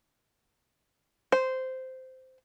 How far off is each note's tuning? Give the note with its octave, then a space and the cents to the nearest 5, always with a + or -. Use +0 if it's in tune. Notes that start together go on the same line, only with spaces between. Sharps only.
C5 -10